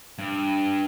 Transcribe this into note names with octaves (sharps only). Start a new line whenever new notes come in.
G2